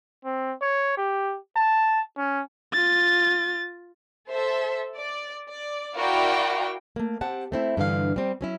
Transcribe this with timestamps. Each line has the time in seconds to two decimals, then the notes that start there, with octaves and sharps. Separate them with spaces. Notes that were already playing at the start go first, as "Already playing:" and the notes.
0.25 C4
0.62 C#5
0.98 G4
1.57 A5
2.18 C#4
2.73 F4 A6
4.29 A4 C5 E5
4.97 D5
5.48 D5
5.96 E4 F#4 A#4 D5 F5 G5
6.96 A3 A#3
7.21 C4 G4 F#5 A5
7.52 A3 C4 E4
7.77 G2 D3 E3 F5
8.16 G3 C4
8.41 F#3 C#4 E4